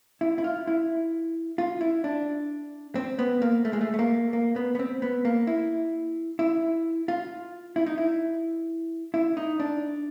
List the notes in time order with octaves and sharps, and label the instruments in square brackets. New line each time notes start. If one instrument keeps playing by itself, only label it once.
[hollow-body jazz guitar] E4
E4
F4
E4
F4
E4
D4
C4
B3
A#3
A3
G#3
A3
A3
A#3
A#3
B3
B3
C4
B3
A#3
E4
E4
F4
E4
D#4
E4
E4
D#4
D4